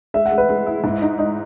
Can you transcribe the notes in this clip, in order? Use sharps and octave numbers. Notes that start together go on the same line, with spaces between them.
G#3 E5
F#5
G#3
B4
G#3
E4
G#2
D#4
D#4 D#5